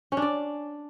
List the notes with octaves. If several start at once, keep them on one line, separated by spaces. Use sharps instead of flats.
C#4
D4
D5